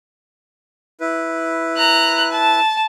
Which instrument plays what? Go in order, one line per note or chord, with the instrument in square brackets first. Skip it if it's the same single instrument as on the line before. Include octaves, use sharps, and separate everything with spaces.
[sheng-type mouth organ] E4 B4
[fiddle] A#5 F#6
A5